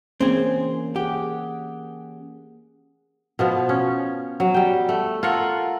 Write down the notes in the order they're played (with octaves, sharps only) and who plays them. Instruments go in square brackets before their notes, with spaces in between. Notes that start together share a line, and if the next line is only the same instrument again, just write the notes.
[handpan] E3 A#3 C#4 [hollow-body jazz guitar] C4 G#4
[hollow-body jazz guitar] G4 [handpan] G#4 F#5
[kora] B2 F3 B3
C#4
F#3
G3 G5
A3
F4 A4 A#4 F#5